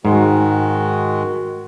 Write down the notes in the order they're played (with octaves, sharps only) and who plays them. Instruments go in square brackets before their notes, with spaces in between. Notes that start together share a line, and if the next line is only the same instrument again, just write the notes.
[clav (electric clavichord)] G#2 [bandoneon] D#3 G#3 [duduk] F#4